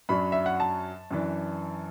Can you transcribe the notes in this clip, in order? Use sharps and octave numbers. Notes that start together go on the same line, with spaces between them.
F#2 F#3 D4 B5
E5
F#5
A5
F#2 E3 D4